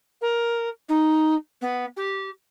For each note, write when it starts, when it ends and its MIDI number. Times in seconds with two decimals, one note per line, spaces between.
0.21 0.69 70
0.89 1.34 63
1.61 1.85 59
1.97 2.30 67